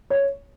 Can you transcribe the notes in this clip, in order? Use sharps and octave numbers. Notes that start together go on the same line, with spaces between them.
C#5